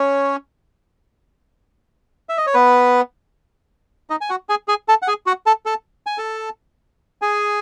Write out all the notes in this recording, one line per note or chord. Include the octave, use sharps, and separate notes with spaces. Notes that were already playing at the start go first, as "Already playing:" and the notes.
Already playing: C#4 C#5
E5
D#5
C#5
B3 B4
D#4 D#5
G#5
F#4 F#5
G#4 G#5
G#4 G#5
A4 A5
F#5
G#4 G#5
F#4 F#5
A4 A5
A4 A5
G#5
A4 A5
G#4 G#5